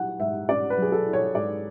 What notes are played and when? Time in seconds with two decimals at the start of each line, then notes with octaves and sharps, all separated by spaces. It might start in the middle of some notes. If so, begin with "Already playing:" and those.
Already playing: F#3 E4 F#5
0.19 G#2 E5
0.49 C#4 D5
0.70 B4
0.77 F#3 G#4
0.92 A4
1.07 E4
1.13 C#5
1.35 G#2 D5